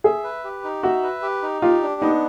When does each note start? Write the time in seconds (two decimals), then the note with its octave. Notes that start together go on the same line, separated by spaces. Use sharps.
0.04 G#4 E5
0.24 B4
0.44 G4
0.64 D#4
0.83 F#4 E5
1.03 B4
1.22 G4
1.42 D#4
1.62 F4 G4
1.82 D4
2.01 B3 D#4